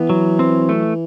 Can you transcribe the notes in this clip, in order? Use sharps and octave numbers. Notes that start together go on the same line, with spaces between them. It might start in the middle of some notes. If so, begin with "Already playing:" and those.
Already playing: E3 B3
F#3
C4
A3